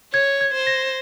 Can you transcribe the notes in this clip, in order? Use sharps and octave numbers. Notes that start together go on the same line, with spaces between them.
C#5 G#6
G#6
C5
A#6